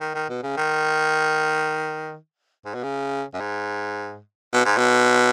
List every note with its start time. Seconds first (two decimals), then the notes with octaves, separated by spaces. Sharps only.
0.01 D#3
0.15 D#3
0.29 B2
0.43 C#3
0.57 D#3
2.65 G#2
2.74 B2
2.83 C#3
3.34 F#2
3.40 G#2
4.53 B2
4.65 G#2
4.78 B2